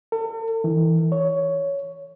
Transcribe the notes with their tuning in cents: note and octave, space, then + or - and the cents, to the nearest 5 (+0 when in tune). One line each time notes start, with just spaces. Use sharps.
A4 +45
E3 -25
C#5 +10